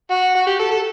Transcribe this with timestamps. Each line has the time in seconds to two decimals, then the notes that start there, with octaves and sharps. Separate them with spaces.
0.11 F#4
0.35 F#4
0.47 G4
0.59 A4
0.71 A4